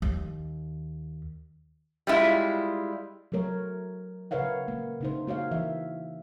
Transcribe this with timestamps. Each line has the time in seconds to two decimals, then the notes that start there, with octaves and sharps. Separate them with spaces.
0.02 D#2
2.07 G3 G#3 E4 F4
3.32 F#3 A3 A#4 C#5
4.31 C#3 A#4 B4 C#5 F5 F#5
4.68 A#3
5.01 C#3 D#4 C5
5.27 A#3 F#4 C#5 F5
5.51 E3 E5